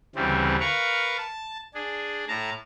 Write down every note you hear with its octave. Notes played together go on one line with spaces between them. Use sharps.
D2 C#3 E3 G3 C4
A#4 B4 F5 C#6
A5
D4 G#4
A2 A5 A#5